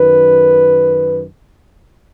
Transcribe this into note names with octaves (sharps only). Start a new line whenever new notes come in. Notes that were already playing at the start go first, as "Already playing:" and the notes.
Already playing: F#2 D#3 B4